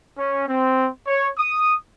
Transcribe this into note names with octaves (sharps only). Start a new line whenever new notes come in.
C#4
C4
C#5
D#6